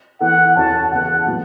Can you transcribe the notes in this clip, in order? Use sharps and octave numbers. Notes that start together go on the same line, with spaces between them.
E3 B3 A4 F#5
E2 E3 C#4 F#4 A4 A5
C#3 E3 B3 A4 F#5
A2 F#3 B3 F#4